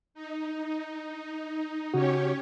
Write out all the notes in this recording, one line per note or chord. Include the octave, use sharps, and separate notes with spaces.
D#4
C#3 C#4 F#4 G4 C#5